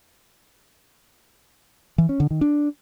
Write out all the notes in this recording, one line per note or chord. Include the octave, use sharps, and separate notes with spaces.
E3
C#4
D3
D#3
D4